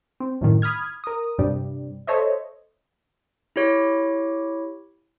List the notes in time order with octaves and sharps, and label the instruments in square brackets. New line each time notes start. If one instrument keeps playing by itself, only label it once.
[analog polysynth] C4
F#2 A2 D#3
B5 D#6 F6 G#6
A#4 D#6
G2 C3 G3
A4 C5 C#5 D#5 E5
[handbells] E4 G4 C#5